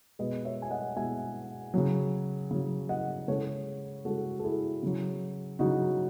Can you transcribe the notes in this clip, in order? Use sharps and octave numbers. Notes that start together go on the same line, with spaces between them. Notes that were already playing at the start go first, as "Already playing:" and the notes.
B2 G#3 B4 D#5
C#5 E5
G#5
D#5 F#5
B2 G#3 E5 G#5
C#3 F#3
C#3 F#3
D#5 F#5
C#3 G#3 A4 C#5
C#3 G#3 F#4 A4
A4
E4 G#4
C#3 F#3
C#3 F#3 D#4 F#4